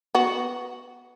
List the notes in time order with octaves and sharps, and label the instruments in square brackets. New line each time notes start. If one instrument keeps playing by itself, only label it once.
[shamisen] B3 F#4